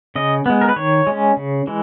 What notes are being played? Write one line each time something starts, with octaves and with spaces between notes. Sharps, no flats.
C#3 D#5
G#3 B3
A#4
B4
D#3 C#5
G#3 C#4
C#3
E3 G#3